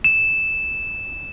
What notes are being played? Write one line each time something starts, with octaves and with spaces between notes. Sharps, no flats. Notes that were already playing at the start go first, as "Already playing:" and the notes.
E7